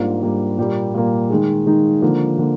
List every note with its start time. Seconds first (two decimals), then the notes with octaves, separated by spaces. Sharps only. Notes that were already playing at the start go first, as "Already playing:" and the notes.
Already playing: G#2 G3 A#3 D4 F4
0.21 G#2 G3 A#3 D4 F4
0.58 A#2 G3 A#3
0.94 A#2 G3 A#3
1.30 D#3 G#3 D#4 G#4
1.66 D#3 G#3 D#4 G#4
2.02 D3 F3 A#3
2.38 D3 F3 A#3